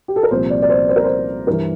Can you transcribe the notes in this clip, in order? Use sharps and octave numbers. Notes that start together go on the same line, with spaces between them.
G4
A4
A#4
C2 A#2 F3 C5
D5
D5
C5
C5
A#4
C5
G2 E3 A#4